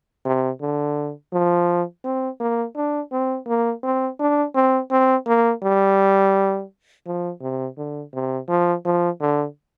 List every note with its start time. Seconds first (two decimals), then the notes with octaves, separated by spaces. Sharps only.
0.25 C3
0.61 D3
1.33 F3
2.04 C4
2.40 A#3
2.76 D4
3.12 C4
3.47 A#3
3.83 C4
4.20 D4
4.55 C4
4.91 C4
5.27 A#3
5.63 G3
7.06 F3
7.42 C3
7.77 D3
8.13 C3
8.49 F3
8.85 F3
9.21 D3